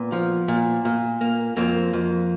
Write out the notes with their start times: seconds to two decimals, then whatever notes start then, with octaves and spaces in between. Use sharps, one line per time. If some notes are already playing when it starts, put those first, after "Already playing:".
Already playing: A#2 B3
0.12 F3
0.48 A#2
0.85 A#2
1.21 A#3
1.57 F2 A#3 C4
1.93 F2